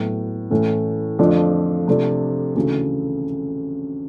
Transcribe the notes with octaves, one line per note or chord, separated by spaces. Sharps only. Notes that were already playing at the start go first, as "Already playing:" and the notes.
Already playing: A2 F#3 B3
A2 E3 A3 C#4 E4
F2 D3 F3 A3 D4
C3 F3 A3 D4
D2 C#3 E3 A3